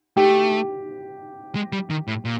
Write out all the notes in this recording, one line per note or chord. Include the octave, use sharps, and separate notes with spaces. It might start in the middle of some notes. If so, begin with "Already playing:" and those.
A3 G4
G#3
G3
D#3
A2
A#2